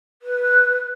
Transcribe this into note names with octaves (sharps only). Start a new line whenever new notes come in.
B4